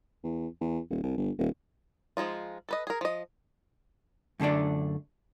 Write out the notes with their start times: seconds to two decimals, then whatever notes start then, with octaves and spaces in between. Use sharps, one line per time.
0.23 E2
0.61 E2
0.90 D#1
1.03 C2
1.17 G1
1.39 D#1
2.17 F3 G#3 D#4 F4
2.69 A4 B4 D#5
2.87 G#4 A#4
3.01 F3 D#5
4.40 F#2 D3 A3 D4 D5